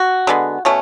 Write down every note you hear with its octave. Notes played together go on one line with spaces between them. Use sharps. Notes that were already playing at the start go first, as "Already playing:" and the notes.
Already playing: F#4
D3 G#3 B3
B2 A3 C#4